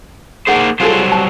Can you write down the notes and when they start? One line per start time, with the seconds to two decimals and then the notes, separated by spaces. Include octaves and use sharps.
0.47 A#3 D#4 G#4 C5 F#5
0.80 F#3 G3 F4 G#4 A4 C5
1.12 A5